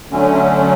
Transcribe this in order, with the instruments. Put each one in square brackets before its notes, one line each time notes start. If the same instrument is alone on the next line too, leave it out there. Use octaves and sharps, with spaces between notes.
[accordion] D3 F#3 A3 C#4